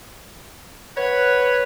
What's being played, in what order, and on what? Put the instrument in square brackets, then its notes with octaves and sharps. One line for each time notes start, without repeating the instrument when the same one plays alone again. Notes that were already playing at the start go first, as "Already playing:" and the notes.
[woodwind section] B4 F#5 B5 [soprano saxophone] C#5